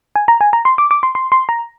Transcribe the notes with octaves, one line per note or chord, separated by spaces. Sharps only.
G#5
A#5
G#5
A#5
C6
D6
D6
C6
C6
C6
A#5